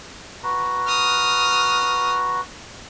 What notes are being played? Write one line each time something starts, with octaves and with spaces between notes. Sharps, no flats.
F#4 B4 A#5
D#6 F6